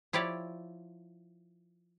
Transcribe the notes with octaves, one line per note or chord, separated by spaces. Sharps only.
F3 E4 G4 C#5 D5